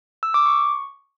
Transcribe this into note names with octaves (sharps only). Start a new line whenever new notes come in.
E6
D6
C#6